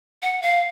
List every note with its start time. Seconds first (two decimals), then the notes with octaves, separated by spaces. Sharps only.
0.22 F#5
0.42 F5